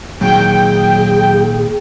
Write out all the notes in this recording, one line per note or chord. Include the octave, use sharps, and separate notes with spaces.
A#2 D#3 F#3 G#3 G#4 G5